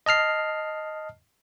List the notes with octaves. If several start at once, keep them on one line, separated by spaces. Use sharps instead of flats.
D#5 A5 F6 C7